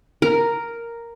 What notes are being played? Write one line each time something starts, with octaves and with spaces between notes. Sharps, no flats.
A#4